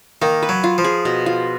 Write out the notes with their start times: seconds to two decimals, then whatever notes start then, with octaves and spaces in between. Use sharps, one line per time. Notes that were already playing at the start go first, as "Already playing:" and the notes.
0.22 D#3 A#3
0.43 B4
0.49 F#3
0.64 F4
0.78 F3
0.84 G#4
1.05 B2
1.26 F4